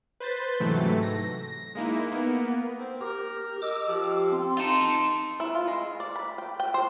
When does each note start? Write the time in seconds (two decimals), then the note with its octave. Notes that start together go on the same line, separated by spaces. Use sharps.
0.20 B4 C5 G6 A6 B6
0.60 G#2 C3 E3 F#3 A3
1.03 A#6
1.75 G#3 A#3 D#4 E4
2.12 A#3 B3
2.80 C4
3.01 G4 A#4
3.62 D#5 D6 E6
3.88 F3 G4
4.32 C4 C6
4.57 D#4 F4 A4
5.40 E4
5.55 F4
5.67 G#3
6.00 D5
6.16 B5
6.38 G5
6.60 G5
6.74 C5